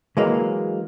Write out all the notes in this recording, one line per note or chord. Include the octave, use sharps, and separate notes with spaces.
E3 F#3 G#3 A#3